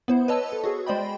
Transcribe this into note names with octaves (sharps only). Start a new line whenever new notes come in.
B3 E4 C5
B4 C#5 D#5 A5 E6
A4
F#4 G#4
G#3 C5 D5 D#5 G5 B5